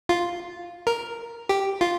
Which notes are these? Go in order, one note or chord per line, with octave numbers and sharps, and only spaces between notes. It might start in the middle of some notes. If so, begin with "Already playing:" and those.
F4
A#4
G4
F4